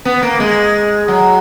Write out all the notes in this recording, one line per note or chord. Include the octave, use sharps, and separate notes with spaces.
B3
A#3
G#3
F#3